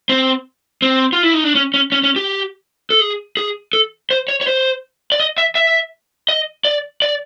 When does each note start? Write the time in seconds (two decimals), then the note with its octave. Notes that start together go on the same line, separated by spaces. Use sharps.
0.09 C4
0.82 C4
1.13 F4
1.23 E4
1.34 D#4
1.44 D4
1.55 C#4
1.74 C#4
1.92 C#4
2.04 C#4
2.16 G4
2.90 A4
3.01 G#4
3.37 G#4
3.73 A4
4.11 C5
4.28 C#5
4.41 C#5
4.47 C5
5.12 D5
5.20 D#5
5.38 E5
5.55 E5
6.29 D#5
6.65 D5
7.02 D5